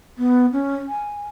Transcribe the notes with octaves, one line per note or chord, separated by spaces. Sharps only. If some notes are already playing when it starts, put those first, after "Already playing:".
B3
C#4
G#5